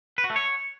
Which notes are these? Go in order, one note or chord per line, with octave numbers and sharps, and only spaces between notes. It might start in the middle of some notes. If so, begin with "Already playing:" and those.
B4
F#4
A3
C#5